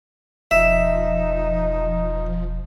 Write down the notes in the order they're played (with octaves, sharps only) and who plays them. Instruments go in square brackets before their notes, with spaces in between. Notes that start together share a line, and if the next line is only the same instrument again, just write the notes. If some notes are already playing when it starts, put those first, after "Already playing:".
[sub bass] E1 [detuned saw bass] F3 [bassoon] D#4 [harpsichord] E5